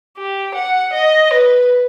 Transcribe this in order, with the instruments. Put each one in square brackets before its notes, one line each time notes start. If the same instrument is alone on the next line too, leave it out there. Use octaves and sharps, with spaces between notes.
[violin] G4
F#5
D#5
B4